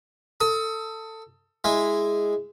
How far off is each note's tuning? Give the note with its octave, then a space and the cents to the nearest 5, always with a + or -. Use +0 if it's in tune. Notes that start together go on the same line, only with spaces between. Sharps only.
A4 +20 D#6 +30
G#3 -5 E4 +0